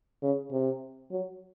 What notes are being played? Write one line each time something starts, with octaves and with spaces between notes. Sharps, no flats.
C#3
C3
F#3